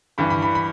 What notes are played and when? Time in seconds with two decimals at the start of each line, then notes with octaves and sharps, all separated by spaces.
0.18 G2 E3 B5
0.30 B5
0.42 B5
0.55 B5